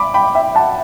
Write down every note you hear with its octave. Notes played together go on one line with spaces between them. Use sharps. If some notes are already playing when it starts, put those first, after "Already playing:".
Already playing: B5 D6
G5 B5
E5 G5
F#5 A5